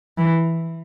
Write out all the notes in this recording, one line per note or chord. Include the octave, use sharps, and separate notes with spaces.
E3